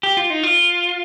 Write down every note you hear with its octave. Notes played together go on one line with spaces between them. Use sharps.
G4
F4
D#4
F4